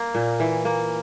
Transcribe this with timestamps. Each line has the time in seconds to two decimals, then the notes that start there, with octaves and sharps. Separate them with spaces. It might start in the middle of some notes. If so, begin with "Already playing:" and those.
Already playing: A#3
0.15 A#2
0.40 E3
0.65 A#3